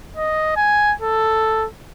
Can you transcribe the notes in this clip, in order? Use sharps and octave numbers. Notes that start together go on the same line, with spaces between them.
D#5
G#5
A4